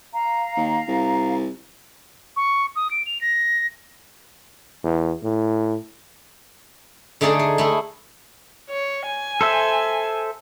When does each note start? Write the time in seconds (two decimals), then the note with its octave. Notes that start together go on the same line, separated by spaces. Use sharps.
0.13 F5 A#5
0.57 D#2
0.88 C2
2.36 C#6
2.76 D#6
2.91 D7
3.06 F7
3.21 A#6
4.83 E2
5.23 A2
7.21 D3 A3 D#4 G#4 D5
7.39 G#4
7.58 A3 E4 G#4
8.70 C#5
9.07 G#5
9.41 A4 C5 E5